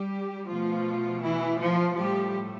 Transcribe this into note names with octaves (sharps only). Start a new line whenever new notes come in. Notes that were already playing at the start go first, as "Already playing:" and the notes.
Already playing: G3 G4
B2 F3 A3 F4
E3 E4
F3 F4
A2 F3 G3 A3 G4